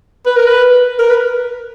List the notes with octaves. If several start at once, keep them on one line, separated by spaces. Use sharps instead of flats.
B4
A#4
B4
A#4
B4